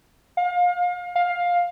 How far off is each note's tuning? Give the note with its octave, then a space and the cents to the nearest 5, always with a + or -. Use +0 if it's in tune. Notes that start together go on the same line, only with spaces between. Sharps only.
F5 +30
F5 +15